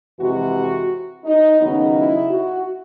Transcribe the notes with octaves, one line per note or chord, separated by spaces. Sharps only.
F2 C3 E3 G#3 F#4
D#4
D#2 C#3 F#3 B3 D#4
E4
F#4